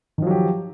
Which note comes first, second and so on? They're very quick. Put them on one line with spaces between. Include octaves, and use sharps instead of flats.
D#3 F3 F#3 G4